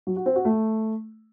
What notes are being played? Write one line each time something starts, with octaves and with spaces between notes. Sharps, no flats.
F#3
F#4
C4
F#4
A3